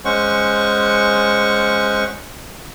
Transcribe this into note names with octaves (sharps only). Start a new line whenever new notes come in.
G#3 C#4 C5 F#5 C#6